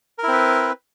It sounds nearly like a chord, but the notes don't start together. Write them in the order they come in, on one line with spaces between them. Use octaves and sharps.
A#4 E4 C4 B4